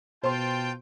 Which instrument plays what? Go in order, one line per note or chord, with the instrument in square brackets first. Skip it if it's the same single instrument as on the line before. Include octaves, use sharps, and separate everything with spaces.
[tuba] B2 [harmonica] F4 A5 [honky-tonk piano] C5 C6 [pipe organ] G5